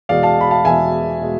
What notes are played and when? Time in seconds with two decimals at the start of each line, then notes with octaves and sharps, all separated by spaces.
0.09 E2 B2 G#3 D5 F5
0.23 F5 A5
0.41 B5
0.51 F5 A5
0.65 E2 B2 G#3 E5 G#5
1.21 B2 G#3